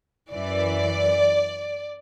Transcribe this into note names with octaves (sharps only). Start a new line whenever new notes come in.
F#2 E3 D5